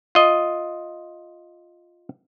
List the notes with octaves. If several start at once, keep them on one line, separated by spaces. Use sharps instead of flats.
F4 D#5